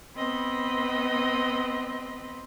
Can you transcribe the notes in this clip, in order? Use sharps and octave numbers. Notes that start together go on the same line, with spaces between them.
B3 C4 D#5 B5